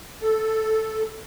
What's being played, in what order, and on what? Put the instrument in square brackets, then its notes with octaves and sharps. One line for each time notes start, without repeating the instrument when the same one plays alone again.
[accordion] A4